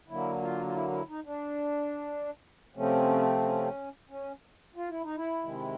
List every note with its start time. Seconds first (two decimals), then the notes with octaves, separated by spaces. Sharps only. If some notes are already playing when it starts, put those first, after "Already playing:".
0.08 D3 F#3 A#3 E4
0.41 F4
0.66 F4
0.74 E4
0.91 E4
1.08 D#4
1.25 D4
2.75 C3 F3 A3 C4 C#4
3.42 C#4
4.09 C#4
4.76 F4
4.89 E4
5.03 D#4
5.16 E4
5.43 C3 D#3 G#3